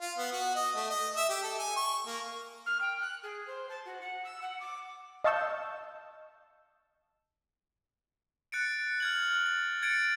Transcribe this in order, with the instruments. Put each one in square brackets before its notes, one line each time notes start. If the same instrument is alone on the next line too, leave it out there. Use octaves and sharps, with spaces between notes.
[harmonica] F4
B3
F#4
D#5
A3
D#5
E5
G4
A4
G#5
C#6
A#3
[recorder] F6
G5
F#6
G#4
C5
A5
F#4
F#5
E6
F#5
D6
[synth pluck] D#5 F5 A5 C#6 E6 G6
[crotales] F#6 A6 C#7 D7
F6 G#6 F#7
A6
G#6 A6 C#7 D7